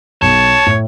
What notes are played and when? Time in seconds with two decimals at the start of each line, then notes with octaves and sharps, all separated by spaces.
0.22 B1 C#5 A5
0.66 A2